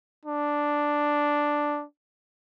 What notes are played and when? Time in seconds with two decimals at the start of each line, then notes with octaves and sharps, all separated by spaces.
0.26 D4